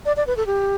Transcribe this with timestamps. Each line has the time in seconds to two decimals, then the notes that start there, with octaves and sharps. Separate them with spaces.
0.06 D5
0.17 D5
0.27 B4
0.37 A4
0.47 G4